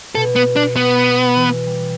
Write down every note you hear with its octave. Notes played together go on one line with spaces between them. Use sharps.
B2 A4
B3
D4
B3
E3
G3